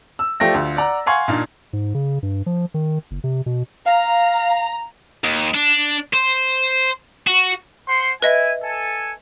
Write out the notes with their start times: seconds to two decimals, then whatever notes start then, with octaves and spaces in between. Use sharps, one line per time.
0.19 E6
0.40 F3 A3 G4 D5 G5 A#6
0.54 D2 F4
0.77 D5 F#5 A#5
1.06 F5 F#5 G#5 C6 C#6 G#6
1.28 A#2 D4 D#4 F5
1.73 G#2
1.94 C#3
2.23 G2
2.46 F3
2.74 D#3
3.11 F#1
3.24 C3
3.46 B2
3.86 F5 A#5
5.24 D#2
5.54 D4
6.14 C5
7.27 F#4
7.88 C5 F#5 C6
8.22 E4 B4 D#5 E5 G#5
8.63 A4 G#5